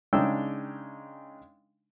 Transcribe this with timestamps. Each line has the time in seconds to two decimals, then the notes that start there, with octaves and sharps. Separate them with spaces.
0.13 C#3 G#3 D4 D#4 G5 E6